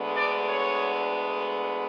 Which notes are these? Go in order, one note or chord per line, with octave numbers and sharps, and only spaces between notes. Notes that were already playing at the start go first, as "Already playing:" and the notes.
Already playing: D2 D3 G#3 B3
D5
C#5